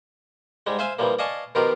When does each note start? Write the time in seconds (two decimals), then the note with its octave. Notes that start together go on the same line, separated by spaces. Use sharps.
0.67 G#2 G3 G#3
0.79 C5 E5 F5 G#5 C6
0.99 E3 F3 G3 A#3
1.19 D5 D#5 F5 G#5 A5 C#6
1.55 B2 D#3 F3 F4 G4 A#4